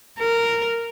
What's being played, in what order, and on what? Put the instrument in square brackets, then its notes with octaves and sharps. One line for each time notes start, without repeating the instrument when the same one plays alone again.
[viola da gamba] A#4